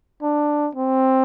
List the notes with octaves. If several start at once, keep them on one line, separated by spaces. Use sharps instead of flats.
D4
C4